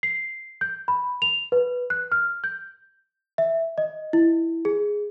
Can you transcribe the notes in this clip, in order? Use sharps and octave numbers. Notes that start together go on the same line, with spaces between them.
C7
G6
B5
F7
B4
F#6
F6
G6
E5
D#5
E4
G#4